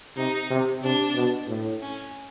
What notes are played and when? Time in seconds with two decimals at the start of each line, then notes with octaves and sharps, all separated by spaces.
0.17 C3 D#4
0.50 C3
0.83 C3 D4
1.15 B2
1.48 A2
1.81 C#4